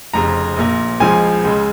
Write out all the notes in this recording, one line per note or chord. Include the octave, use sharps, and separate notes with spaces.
F1 F2 C#3 A#5
A#1 A#2 A#3
C#2 C#3 F3 G#3 G#5
C#2 C#3 G#3